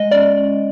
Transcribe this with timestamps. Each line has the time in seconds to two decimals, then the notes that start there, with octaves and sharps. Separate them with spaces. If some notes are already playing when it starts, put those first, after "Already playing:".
Already playing: G#3 D#5
0.11 C#4 D5